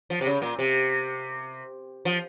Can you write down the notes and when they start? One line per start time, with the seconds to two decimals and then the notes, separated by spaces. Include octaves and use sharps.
0.10 F3
0.21 C3
0.26 C#3
0.42 A#2
0.59 C3
2.05 F3